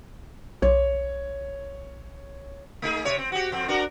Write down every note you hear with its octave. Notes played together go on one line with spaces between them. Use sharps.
B1 C#5
A3 D#4 G#4
C3 C#5
C4
F#4 G4
F2 C4
D4 F#4 A#4